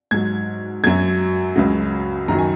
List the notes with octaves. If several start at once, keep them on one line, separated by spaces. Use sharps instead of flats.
G#2 F#3 G#6
F#2 F#3 G#6
C#2 C#3 F#3
F#2 D#3 F#3 A#5
G#5